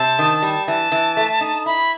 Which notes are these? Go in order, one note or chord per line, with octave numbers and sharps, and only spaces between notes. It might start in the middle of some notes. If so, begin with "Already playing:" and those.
Already playing: C3 A5
D#3
G3
E3 A5
E3
A3
D#4
E4 B5